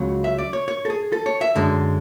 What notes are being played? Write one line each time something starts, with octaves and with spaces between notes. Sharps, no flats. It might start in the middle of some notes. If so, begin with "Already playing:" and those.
Already playing: C#2 C#3 F#3
E5
D5
C#5
C#5
A4
G#4
A4
C#5
E5
F#2 D3 G#3